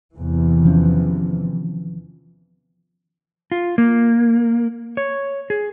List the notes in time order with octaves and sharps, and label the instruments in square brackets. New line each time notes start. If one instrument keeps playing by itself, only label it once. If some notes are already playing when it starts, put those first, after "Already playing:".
[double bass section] E2 C3 E3
[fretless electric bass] D#3 F3 C#4
[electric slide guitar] F4
A#3
C#5
G#4